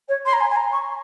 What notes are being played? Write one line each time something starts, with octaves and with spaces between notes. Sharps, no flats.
C#5
C6
A#5
G#5
G#5
A#5
C#6